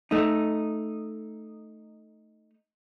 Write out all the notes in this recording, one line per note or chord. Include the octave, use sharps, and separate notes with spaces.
A3 D#4